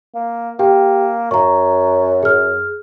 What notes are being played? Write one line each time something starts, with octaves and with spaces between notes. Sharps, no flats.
A#3
A#3 G4 G5
F#2 A#5 C#6
G#4 F6